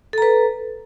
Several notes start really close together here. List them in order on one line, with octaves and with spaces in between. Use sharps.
A4 A#5 B4